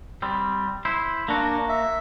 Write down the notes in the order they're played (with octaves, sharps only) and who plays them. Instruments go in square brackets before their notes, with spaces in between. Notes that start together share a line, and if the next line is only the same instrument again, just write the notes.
[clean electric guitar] G3 C4
E4 C5
[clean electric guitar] A#3 F#4 [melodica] D4
[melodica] E5